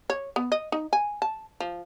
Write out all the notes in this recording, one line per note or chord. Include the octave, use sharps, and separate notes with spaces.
C#5
B3
D#5
D#4
G#5
A5
F3